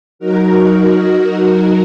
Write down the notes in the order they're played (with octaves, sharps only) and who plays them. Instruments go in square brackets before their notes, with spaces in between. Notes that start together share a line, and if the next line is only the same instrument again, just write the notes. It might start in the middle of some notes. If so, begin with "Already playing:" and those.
[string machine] F#3 D#4 F#4 A#4